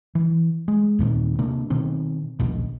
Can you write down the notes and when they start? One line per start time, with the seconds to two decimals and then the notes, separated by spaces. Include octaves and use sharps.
0.15 E3
0.68 G#3
0.99 D#2 A#2 D#3 C4
1.39 C3 A3 A#3 D4
1.70 B2 D#3 C4
2.39 A#1 D#2 B2